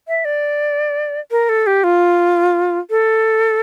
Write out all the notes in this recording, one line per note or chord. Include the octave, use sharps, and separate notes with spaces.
E5
D5
A#4
A4
G4
F4
A4